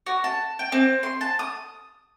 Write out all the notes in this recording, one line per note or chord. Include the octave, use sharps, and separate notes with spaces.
F#4
A5
G5
C4
C6
A5
D#6